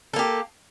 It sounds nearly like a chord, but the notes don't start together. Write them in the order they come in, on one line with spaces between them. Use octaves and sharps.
A4 A#3 G4